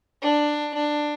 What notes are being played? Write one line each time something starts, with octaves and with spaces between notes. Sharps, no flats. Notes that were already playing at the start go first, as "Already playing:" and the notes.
D4
D4